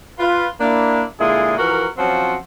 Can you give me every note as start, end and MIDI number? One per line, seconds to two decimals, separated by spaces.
0.19 0.48 65
0.19 0.48 71
0.60 1.03 58
0.60 1.03 62
0.60 1.03 64
1.19 1.55 46
1.19 1.55 50
1.19 1.55 56
1.19 1.55 64
1.19 1.55 65
1.19 1.55 68
1.58 1.88 52
1.58 1.88 53
1.58 1.88 66
1.58 1.88 70
1.98 2.36 53
1.98 2.36 54
1.98 2.36 60
1.98 2.36 61
1.98 2.36 65
1.98 2.36 66